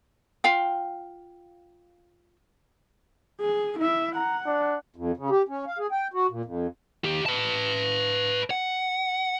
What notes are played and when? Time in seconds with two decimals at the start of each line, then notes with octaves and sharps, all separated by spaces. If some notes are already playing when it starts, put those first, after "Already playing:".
0.44 F4 F5 G5
3.40 G#4
3.79 E4 E5
4.15 F#5 A#5
4.46 D4
4.96 F2
5.17 C#3
5.30 G4
5.49 C#4
5.67 F5
5.79 G#4
5.92 G5
6.13 F#4
6.31 A#2
6.45 F2
7.04 D#2 G4
7.26 B4 A5
8.51 F#5